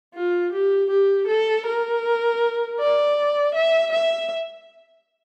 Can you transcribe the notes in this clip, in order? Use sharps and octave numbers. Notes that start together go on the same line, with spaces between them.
F4
G4
G4
A4
A#4
D5
E5
E5